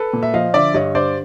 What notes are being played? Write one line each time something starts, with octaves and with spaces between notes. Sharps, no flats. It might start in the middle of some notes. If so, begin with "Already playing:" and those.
Already playing: A4 B4
A#2
E5
F3 D#5 F5
D3 D5 E5
G2 C#5 D#5
D3 C5 D5